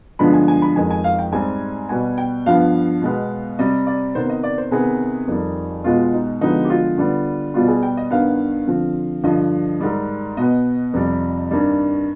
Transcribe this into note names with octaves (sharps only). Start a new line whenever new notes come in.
G2 D3 F3 G#3 B3 B5
G#5
G#5
B5
F2 D#3 G#3 G#5
G#5
F5
G5
G#2 G3 C4 G#5
B2 G3 B3 G#5
G5
G2 F3 B3 F5
B2 G#3 B3
C3 G3 C4 D#5
D5
C3 D#3 B3 C5
D#5
D5
C5
C3 D#3 B3 G#4
F2 D#3 G3
B2 G#3 B3 F4
D#4
D3 F3 G#3 B3 D#4
G4
F4
D3 G3 B3
B2 G3 B3 F4
G#4
G5
D#5
G2 D#3 B3 F5
D3 F3 C4
G2 D3 F3 D#5
G#2 D#3 G3
B2 B3 D#5
F2 C3 G3
G2 D#3 G3 C4